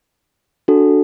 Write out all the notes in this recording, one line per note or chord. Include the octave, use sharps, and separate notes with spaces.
D4 F#4 A4